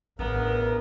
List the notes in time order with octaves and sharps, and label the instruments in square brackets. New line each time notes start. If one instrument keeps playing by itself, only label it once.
[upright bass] A1 D4 [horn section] C#3 E3 B3 [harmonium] A#4